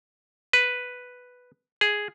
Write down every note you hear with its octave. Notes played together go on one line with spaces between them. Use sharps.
B4
G#4